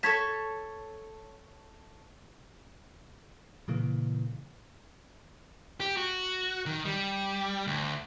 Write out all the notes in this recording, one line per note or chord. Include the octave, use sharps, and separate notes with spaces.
A4 C#5 A5 G#6 B6 E7
A#2 C#3 E3 A#3
G4
F#4
D#3
G3
D2